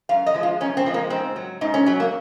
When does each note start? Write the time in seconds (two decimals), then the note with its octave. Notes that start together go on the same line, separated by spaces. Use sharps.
0.09 F#2 F5
0.26 D#5
0.34 F3 G#3
0.43 F4
0.61 F#2 C#4
0.77 C4
0.86 F3 G#3
0.94 A#3
1.10 G#2 C4
1.36 F#3
1.61 G#2 D#4
1.74 C#4
1.86 F#3 C#4
2.00 A#3